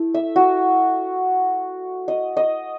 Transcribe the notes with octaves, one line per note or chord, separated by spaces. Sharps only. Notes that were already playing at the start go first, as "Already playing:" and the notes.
Already playing: A3 E4
E5
F#4
D#5
D#5